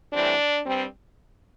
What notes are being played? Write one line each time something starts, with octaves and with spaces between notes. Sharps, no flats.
A2 E3 G3 C4 D4
G2 G3 C4